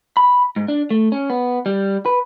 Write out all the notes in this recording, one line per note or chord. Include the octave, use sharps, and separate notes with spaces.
B5
G#2
D4
A3
C#4
B3
G3
B4